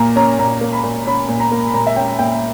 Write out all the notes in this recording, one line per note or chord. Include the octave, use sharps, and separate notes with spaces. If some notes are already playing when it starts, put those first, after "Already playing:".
Already playing: A#2 A#3 A#5
C#4 A#5
A#2 A#5
A#3
B5
A#2
C#4 B5
A#2
A#5
A#3
B5
A#2 A#5
E5
C#4 G5
A#2 G5